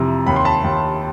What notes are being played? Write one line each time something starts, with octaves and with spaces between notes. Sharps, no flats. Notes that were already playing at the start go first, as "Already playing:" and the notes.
Already playing: F2 C3 E3 A#5
D#2 B5
C6
A5 B5
D#2